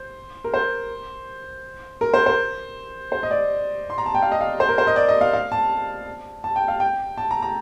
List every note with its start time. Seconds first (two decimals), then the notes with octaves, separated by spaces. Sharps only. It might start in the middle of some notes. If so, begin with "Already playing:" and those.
Already playing: C5
0.44 A#4
0.54 C5
2.01 A#4
2.14 C5
2.26 C5
3.12 C5
3.23 D#5
3.31 D5
3.90 C6
3.98 A#5
4.06 A5
4.14 G5
4.22 F5
4.32 D#5
4.41 F5
4.60 C5
4.69 A#4
4.78 C5
4.87 D#5
4.96 D5
5.08 D#5
5.21 F5
5.33 F5
5.52 A5
6.44 A5
6.56 G5
6.68 F5
6.80 G5
7.17 A5
7.31 A#5
7.42 A#5